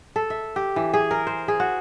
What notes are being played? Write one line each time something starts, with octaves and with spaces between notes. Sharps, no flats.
A4
E5
G4
E3
G#4
A#4
C5
G#4
F#4